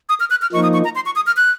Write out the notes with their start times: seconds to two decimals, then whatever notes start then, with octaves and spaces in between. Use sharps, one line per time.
0.09 D#6
0.20 F6
0.30 F#6
0.42 F6
0.52 F3 A#3 D#4 C#6
0.63 D#6
0.73 C#6
0.84 A#5
0.95 C6
1.06 C#6
1.16 D#6
1.27 F6
1.37 F#6